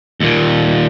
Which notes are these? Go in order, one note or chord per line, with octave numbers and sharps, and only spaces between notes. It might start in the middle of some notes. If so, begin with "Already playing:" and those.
D#2 A#2